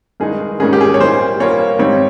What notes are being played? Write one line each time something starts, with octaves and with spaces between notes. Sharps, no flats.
G2 D#3 G#3 D#4 G#4
G#2 D#3 G3 A#3 C#4 G#4
G4
G#4
C#5
A#2 G3 A#3 D#4 C5
G2 G3 A#3 F4 C#5
G#2 G3 C4 D#4 C#5